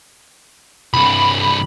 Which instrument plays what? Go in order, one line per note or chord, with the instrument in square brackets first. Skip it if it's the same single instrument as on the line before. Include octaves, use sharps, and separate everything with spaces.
[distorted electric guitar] C2 G2 [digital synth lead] B5